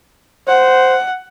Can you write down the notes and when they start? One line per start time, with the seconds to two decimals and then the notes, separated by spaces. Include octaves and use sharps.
0.47 C5 F#5